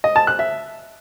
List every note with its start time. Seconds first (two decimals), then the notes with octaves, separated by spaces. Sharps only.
0.04 D#5
0.16 A5
0.27 F#6
0.39 E5